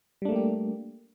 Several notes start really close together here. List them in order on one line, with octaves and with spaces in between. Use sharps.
G3 D4 A3 A#3 G4